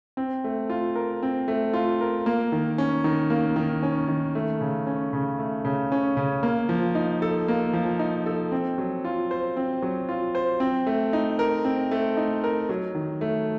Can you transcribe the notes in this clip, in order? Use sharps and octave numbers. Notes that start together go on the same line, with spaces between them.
C4
A3
F4
A#4
C4
A3
F4
A#4
A#3
D#3
C#4
D#3
A#3
D#3
C#4
D#3
A3
C#3
C#4
C#3
A3
C#3
C#4
C#3
A#3
F3
D#4
A4
A#3
F3
D#4
A4
C4
F#3
F4
C5
C4
F#3
F4
C5
C4
A3
D#4
A#4
C4
A3
D#4
A#4
F#3
D#3
A3